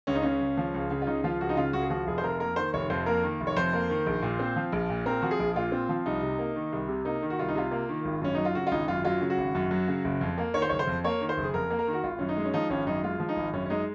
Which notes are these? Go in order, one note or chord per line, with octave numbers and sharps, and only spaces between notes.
C#2 C#4
D#4
C#3 C#4
C#2
F3
C#2
C#3
F4
C#2 D#4
F3 F4
C#2 F#4
D#4
C#3 F4
C#2 F#4
G#4
F3 F#4
F1 G#4
C5
F2 A#4
A#3 A#4
D#3 C5
F1 C#5
F2 C5
A#3 A#4
D#3
F1
C#5
F2 C5
A#3
D#3
A#1
A#2
C4
F3
A#1
A#2
C4 A#4
F3 F#4
G#4
A#1
A#2 F4
C4
F3
C2 D#4
C3
A#3
D#3
C2
C3
A#3 D#4
D#3
F#4
C2 F4
D#4
C3 F4
A#3
D#3
G#1
F#2 C#4
F#3 D#4
F4
C#3 F#4
F4
G#1 D#4
F#2 F4
F#3 F4
C#3
F#4
G#1
F#2
F#3
C#3
F#1
F2
A#3
D#3 C#5
C5
F#1 C#5
C5
F2
A#3 C#5
D#3
C5
F#1
G#4
F2 A#4
A#3
A#4
D#3
F#4
G#1 F4
F#2 C#4
D#4
G#3
C#4
F3 D#4
G#1 C#4
F#2 D#4
G#3 F4
F3
D#4
G#1
F#2 C#4
C#4
G#3 D#4